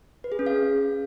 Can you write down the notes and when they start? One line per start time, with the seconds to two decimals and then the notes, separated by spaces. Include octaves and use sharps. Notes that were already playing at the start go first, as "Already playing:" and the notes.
0.24 B4
0.32 G#4
0.39 C#4
0.46 F5